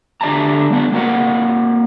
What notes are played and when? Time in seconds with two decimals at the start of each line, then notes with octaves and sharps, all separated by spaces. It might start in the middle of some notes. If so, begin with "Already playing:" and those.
0.21 D3 G4 D5 E5 A5 A#5
0.70 G3 B3 D4
0.93 A#3 C4 F#4 A#4 D5 F#5